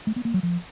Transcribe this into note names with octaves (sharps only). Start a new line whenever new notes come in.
A3
B3
A#3
F#3
F3